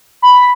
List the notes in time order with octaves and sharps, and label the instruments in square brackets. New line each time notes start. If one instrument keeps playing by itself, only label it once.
[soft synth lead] B5